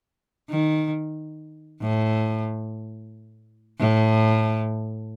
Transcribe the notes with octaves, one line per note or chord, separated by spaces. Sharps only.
D#3
A2
A2